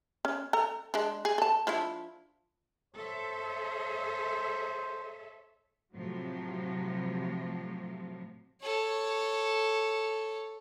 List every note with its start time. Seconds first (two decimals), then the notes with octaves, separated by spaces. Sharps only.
0.25 C#4
0.53 A4 A#5
0.94 G#3 D4
1.25 G#4
1.38 A4 A5
1.67 F3 D4 E4
2.94 A4 C5 C#5 E5
5.94 A2 C3 F3 F#3
8.62 A4 C#5